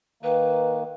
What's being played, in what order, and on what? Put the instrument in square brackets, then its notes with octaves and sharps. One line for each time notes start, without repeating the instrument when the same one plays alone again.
[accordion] D#3 A#3 [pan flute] B4